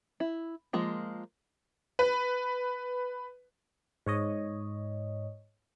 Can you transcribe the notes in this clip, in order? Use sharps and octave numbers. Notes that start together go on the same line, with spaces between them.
E4
F3 G#3 A#3 F4
B4
G#2 C#5 D#5